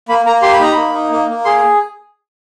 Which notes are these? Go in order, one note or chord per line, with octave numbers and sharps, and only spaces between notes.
A#3 B5
A#3 A#5
G4 C6
B5
D#4 A#5
A#3 B5
D#4
A#3
A#3
G#4 C6